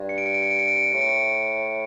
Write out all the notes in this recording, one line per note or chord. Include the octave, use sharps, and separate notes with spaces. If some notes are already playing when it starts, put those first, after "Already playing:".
Already playing: G2
C#7
D7
C#7
D7
C#7
D7
C#7
D7
C#7
D7
A2 C#7
D7
C#7